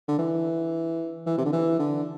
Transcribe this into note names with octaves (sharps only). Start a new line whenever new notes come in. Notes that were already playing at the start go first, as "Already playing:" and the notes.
D3
E3
E3
C3
D3
E3
D3